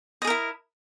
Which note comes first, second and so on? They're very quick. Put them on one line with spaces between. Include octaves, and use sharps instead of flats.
D#5 G#4 A#4 E4